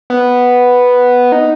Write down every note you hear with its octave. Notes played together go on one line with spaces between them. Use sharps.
B3
D#4